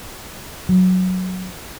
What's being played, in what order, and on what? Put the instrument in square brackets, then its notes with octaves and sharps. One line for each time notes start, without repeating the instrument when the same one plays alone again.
[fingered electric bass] F#3